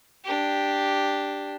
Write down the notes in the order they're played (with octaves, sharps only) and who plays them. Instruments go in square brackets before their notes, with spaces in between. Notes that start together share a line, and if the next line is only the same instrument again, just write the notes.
[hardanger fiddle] D4 G4